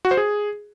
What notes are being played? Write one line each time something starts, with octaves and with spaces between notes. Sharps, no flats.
F#4
C5
G#4